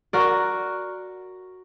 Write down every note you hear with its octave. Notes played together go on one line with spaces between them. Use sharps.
F#4 A#4 D5